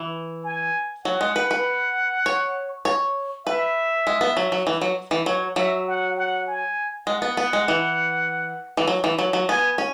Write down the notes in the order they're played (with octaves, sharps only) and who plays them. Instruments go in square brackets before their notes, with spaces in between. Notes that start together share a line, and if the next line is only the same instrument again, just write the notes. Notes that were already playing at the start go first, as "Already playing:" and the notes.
Already playing: [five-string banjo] E3
[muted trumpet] G#5
[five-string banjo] F#3 [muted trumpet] F#5
[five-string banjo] G#3
B4
B4
C#5
C#5
[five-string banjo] B4 [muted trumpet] E5
[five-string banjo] G#3
B3
F#3
F#3
E3
F#3
E3
[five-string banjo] F#3 [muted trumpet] C#5
[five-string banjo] F#3 [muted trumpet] E5
[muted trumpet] F#5
F#5
G#5
[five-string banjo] G#3 [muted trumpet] F#5
[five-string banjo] B3
B3
G#3
E3
E3
F#3
E3
F#3
F#3
[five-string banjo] B3 [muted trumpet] G#5
[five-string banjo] C#4